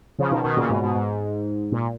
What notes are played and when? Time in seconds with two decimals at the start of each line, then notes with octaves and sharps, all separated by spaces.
0.19 C#3 F3
0.31 B2 D#3
0.44 B2 D#3
0.57 A#2 C#3
0.69 G#2 B2
0.83 G#2 B2
0.95 G#2
1.72 A#2